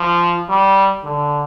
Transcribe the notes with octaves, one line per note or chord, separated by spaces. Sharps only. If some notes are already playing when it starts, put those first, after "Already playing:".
Already playing: F3
G3
D3